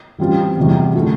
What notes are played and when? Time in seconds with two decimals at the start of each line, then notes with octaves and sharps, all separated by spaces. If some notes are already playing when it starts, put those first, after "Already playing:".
0.19 E3 G3 C4 F4
0.57 E2 C3 G3
0.95 D3 A3 E4